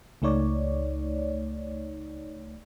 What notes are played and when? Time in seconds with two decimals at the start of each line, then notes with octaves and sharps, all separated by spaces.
0.22 C#2 A3 D#4 C#5 D5